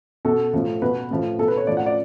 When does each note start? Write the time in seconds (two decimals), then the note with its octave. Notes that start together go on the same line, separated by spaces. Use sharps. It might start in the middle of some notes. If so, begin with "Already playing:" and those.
0.25 B2 A4
0.53 A2 F3
0.82 B2 B4
1.11 A2 F3
1.39 B2 A4
1.48 B4
1.57 C#5
1.67 A2 F3 D5
1.77 F#5
1.86 D5